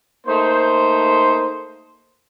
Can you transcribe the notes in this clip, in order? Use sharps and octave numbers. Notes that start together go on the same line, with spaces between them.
A3 A#3 D#4 C5